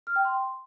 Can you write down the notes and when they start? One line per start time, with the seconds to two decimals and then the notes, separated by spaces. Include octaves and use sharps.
0.07 F6
0.16 G5
0.25 C6